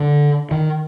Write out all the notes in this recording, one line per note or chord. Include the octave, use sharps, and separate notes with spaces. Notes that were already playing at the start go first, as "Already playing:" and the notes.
Already playing: D3
D#3